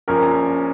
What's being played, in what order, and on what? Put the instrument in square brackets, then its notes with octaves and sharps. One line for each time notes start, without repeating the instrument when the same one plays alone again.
[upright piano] A#1 A#2 F3 C#4 A#4